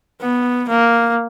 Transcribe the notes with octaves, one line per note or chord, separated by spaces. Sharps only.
B3
A#3